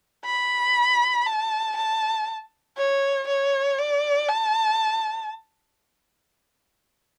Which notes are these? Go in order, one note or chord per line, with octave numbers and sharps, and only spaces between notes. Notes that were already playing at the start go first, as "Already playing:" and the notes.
B5
A5
A5
C#5
C#5
D5
A5